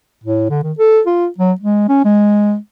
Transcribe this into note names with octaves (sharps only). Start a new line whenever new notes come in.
A2
D3
D#3
A4
F4
F#3
G#3
C#4
G#3